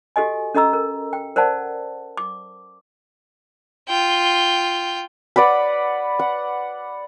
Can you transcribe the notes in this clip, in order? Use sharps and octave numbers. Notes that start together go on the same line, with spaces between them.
F#4 G4 A4 D#5 G#5
C#4 A4 D#5 A#5 E6
A#4
G5
A#4 C5 D5 F#5 A5
D6
F4 G5
B4 D5 F#5 B5
F#5